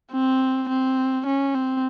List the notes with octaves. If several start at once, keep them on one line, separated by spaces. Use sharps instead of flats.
C4
C4
C#4
C4